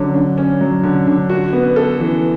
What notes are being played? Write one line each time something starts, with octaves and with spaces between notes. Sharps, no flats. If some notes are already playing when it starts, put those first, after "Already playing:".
Already playing: D3 F#3 C#4
D3
C#4
F#3
D3
D3
F#4
B3
A4
E3